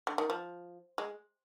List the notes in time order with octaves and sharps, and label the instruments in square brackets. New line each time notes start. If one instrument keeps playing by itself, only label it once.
[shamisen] D3
D#3
F3
G#3